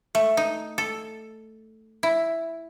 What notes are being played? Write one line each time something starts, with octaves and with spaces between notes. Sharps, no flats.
A3
D#4
A4
E4